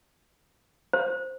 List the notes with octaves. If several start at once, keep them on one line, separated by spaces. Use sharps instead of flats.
C5